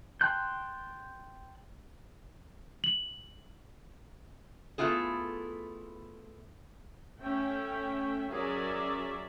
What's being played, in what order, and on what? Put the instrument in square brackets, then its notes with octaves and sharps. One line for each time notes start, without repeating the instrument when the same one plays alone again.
[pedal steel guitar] G5 A5 C6 F#6 G6
[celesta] F#7
[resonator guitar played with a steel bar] A3 B3 E4 F4 G#4
[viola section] A3 C#4 E5 G5
F#3 C#4 G#4 A#4 D5 E5